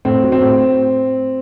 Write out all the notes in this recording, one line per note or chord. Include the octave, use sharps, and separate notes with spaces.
A2 C4
F#3
C4
A2